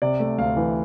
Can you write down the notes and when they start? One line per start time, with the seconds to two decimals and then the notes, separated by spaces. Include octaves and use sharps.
0.02 C3 D5
0.20 A3
0.38 D2 F5
0.57 E3